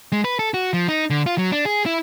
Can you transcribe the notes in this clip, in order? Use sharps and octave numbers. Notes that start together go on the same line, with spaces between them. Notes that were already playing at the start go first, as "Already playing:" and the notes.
G#3
B4
A4
F#4
F3
D#4
D3
F4
F#3
D4
G#4
E4